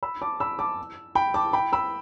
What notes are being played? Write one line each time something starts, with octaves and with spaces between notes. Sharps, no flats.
B5 E6
A5 D6
B5 E6
A5 D6
G5 B5
A5 D6
G5 B5
B5 E6